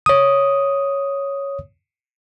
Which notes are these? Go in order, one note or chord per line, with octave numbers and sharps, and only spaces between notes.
C#5 D#6